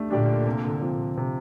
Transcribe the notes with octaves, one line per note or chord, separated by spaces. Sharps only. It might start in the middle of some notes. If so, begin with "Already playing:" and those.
Already playing: A3 D4 G4 D5
A#2 D3 D4 G4 D5
C3
F3 C4
C3